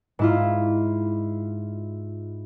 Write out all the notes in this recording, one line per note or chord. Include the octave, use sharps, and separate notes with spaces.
G#2 E4 F4